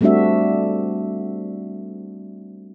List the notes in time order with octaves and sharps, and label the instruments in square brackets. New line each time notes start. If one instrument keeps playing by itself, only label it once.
[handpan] G3 A3 C4 D4 F#4 E5